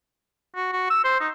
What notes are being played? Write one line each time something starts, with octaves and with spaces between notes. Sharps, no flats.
F#4
F#4
E6
C5
D#4